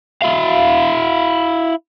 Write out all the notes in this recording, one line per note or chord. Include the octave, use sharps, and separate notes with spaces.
E4 F5